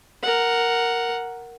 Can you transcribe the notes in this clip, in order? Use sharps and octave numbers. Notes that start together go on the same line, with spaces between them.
A#4 F#5